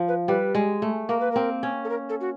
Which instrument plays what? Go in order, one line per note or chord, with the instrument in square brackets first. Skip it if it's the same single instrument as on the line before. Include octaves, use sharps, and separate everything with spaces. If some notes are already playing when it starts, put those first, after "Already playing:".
Already playing: [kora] F3
[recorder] B4
[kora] G3 [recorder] B4
[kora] G#3
A3
[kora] A#3 [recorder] A#4
[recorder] B4
[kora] C4 [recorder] A#4
[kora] C#4
[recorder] A4
A#4
A4
F#4